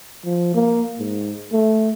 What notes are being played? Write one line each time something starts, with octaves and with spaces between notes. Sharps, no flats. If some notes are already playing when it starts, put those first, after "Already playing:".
F3
A#3
G#2
A3